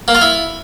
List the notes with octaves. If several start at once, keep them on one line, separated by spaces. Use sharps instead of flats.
A#3
F4
E4